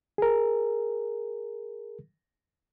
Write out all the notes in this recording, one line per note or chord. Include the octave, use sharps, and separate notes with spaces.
G#4 A#4